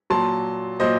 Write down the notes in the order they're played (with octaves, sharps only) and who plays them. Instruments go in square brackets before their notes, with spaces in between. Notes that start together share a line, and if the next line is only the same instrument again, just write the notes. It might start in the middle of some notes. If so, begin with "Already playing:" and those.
[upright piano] A#2 F#3 A5 C6
A#2 F#3 C5 D#5